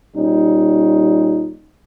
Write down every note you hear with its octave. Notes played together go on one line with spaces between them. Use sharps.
A#2 G3 C#4 D#4